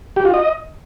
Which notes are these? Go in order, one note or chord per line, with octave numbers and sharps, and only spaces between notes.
G4
F4
D#5